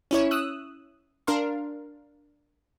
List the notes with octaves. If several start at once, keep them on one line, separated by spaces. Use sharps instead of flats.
C#4 E4 C#5
D#6 E6 F#6
D4 A#4 F5 C6